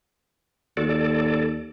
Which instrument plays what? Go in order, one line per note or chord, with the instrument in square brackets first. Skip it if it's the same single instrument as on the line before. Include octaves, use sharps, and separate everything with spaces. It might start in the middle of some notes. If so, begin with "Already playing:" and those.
[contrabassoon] D#2 [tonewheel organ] F#4 A4 D5
[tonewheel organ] A4 D5